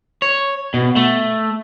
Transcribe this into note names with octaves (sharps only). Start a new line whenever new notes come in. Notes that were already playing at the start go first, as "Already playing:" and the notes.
C#5
B2
A3